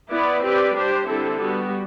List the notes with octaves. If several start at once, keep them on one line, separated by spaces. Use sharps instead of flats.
B3 E4 B4 D5
C4 G4 B4 D5
G3 D4 G4 C5
D3 G3 C4 E4 A4
G3 B3 F#4